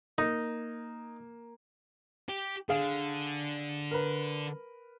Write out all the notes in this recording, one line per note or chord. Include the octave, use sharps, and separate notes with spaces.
A#3 D#4
G4
D3 G#4 F5
A#4 B4